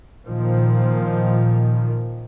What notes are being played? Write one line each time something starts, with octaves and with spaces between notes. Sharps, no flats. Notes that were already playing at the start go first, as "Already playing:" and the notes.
A#2 D#3 F3